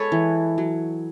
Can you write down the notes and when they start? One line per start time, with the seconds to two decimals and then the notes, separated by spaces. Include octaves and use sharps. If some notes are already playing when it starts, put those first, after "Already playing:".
Already playing: G#3 A4 B4 C#5
0.12 E3
0.58 F#3